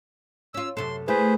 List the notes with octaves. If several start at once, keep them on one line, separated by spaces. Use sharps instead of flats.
C#4 F4 E6
F#2 C3 A4 C6
A3 E4 G#4 B4 C5